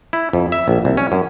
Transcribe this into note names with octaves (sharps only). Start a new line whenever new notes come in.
E4
F2
E5
A#1
C2
C#4
F#2